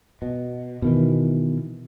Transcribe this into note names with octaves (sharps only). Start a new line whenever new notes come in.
B2
B2 D#3 E3